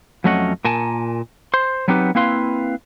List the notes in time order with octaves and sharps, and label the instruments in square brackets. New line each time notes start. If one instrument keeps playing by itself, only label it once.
[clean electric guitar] F2 F#3 A3 C#4 D#5 F#5
A#2 A#4 G#5 A5
C5 C6
F#3 B3 C4 D#4 G4 B4
A#3 C4 E4 B4 F5 C6